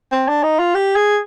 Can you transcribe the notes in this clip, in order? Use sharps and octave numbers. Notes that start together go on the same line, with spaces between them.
C4
D4
D#4
F4
G4
G#4